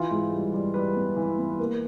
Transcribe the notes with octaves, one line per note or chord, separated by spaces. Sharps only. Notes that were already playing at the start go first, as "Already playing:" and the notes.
Already playing: E3 F4
G#2
G3
G3
G3 B4
B3
E3
B3
A#3